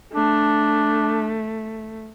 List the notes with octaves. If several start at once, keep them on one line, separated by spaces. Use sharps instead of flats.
A3 D4